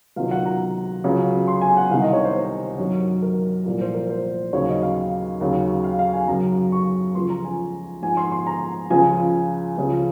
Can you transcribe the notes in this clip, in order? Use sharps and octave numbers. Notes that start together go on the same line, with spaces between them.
C#2 C3 D#3 F#3 F5
F#5
A#5
C#2 C#3 F#3
C6
G#5
F#5
C2 C3 D#3 F5
D#5
C#5
C5
C5
F#2 D#3 F#3 C#5
A#4
C2 A#2 F3 A#4
C5
A#4
C5
D#2 C#3 F#3 C#5
D#5
F5
D#2 C#3 F#3
F5
F5
G#5
F#2 C#3 F#3 A#5
C#6
C#2 C#3 F3 C6
A#5
G#5
G#2 F3 G#5
C6
C6
A#5
C#2 C#3 F3 G#5
C#2 C#3 F3